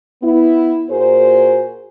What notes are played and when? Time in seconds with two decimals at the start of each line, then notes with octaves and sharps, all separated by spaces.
0.22 B3 E4
0.90 A#2 F#4 G#4 A#4 C5